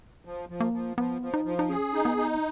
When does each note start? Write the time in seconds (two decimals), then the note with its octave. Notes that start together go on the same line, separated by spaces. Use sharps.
0.25 F3
0.49 F3
0.60 A#3
0.73 F3
0.97 F3 B3
1.22 F3
1.34 D#4
1.45 F3
1.59 D#4
1.69 C#4 G#4
1.93 D#4
2.05 B3
2.17 D#4